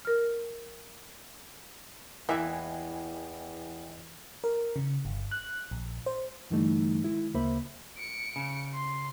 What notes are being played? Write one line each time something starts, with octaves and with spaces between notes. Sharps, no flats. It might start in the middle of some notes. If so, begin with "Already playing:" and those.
A#4 F6
E2 E3 A#3 D#5 E5 G5 G#5
A#4
C#3
G1
F#6
A#1
C5
G2 D3 E3 G3 A3 D#4
D#3 G#3 E4
D2 C#3 A#3 C5 E5 B5
C#7 D7
C#3
C6